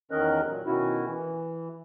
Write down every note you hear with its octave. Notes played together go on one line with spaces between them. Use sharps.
E2 D#3 C#4 A#4 D#5 F#6
A#2 F#3
B2 D#3 C#4 E4 F#4
E3